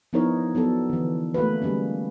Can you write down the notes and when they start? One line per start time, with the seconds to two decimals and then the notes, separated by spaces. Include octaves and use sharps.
0.13 F3 B3 D#4 E4 A#4 C#5
0.55 F#3 B3 D4 A4
0.89 D3 E3
1.34 A3 A#3 F#4 B4
1.62 D3 G3 G#3 A#3 C#4